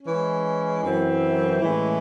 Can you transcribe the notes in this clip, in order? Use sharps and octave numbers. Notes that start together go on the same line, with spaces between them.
E3 G#3 C#4
F#2 E3 C4 E4
A2 E3 G#3 C#4 E4